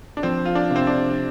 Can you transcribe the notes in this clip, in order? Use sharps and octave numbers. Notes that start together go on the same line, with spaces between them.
D4
F3 C4
F4
D4
C3 C4
D4